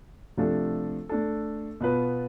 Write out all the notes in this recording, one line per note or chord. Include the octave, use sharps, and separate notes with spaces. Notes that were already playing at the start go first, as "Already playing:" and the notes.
C3 F3 A3 D4 A4
A3 D4 A4
B2 B3 F4 B4